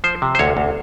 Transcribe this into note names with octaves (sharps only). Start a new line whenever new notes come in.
F3 C5
C3
C5
D2 C#5
D2